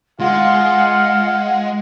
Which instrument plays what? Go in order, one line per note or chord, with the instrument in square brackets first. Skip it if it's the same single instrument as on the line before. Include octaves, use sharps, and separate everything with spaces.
[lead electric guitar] G#3 [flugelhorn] F4 [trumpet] F5 [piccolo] F#5